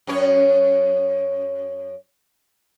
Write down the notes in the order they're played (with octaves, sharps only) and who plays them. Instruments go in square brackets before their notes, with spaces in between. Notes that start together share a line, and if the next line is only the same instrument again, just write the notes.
[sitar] F#2 C#4 C#5